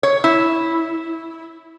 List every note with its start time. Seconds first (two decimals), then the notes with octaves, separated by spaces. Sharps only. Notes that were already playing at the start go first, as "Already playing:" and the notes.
0.03 C#5
0.24 E4